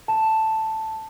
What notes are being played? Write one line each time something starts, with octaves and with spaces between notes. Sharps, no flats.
A5